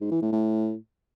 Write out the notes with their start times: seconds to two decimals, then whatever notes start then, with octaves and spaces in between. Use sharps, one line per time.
0.01 G#2
0.11 E3
0.22 A2
0.32 A2